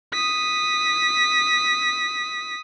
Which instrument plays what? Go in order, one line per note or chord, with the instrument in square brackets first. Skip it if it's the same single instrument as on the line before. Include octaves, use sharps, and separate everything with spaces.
[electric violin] D#6 B6